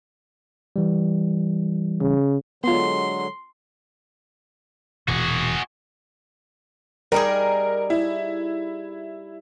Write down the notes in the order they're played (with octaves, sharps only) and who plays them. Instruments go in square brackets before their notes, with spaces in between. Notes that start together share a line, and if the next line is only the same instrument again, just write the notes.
[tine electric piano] E3 G3
[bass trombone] C#3
[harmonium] D3 F#3 G#3 [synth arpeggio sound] B3 F4 [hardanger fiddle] C6
[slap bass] E1 A#2 [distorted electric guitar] F#4 G#4
[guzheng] G3 D#4 G#4 [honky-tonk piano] A#4
[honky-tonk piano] E4